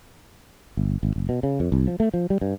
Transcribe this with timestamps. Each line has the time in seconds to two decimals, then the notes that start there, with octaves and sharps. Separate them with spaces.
0.77 G1
1.03 G#1
1.16 F#1
1.29 B2
1.43 C#3
1.60 F2
1.72 C2
1.87 F3
2.00 A3
2.14 F3
2.30 G3
2.41 G2